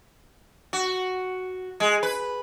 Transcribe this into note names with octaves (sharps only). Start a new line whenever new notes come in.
F#4
G#3
B4